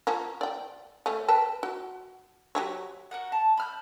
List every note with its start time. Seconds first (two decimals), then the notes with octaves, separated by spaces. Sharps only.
0.07 F3 A#3 C#4
0.41 D5 G5
1.06 A3 C#4
1.28 B4 G5 A5
1.63 F#4
2.55 F#3 G4 C#5
3.11 F#4 A#4 F#5
3.32 A5
3.57 B5 F6 G6